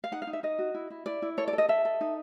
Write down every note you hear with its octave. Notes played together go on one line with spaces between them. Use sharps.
F5
D#4 F#5
F5
D#4
E5
D#4 D#5
F#4
E4
E4
E4 D5
E4
A4 C#5
D5
A4
D#5
A4 E5
A4
D#4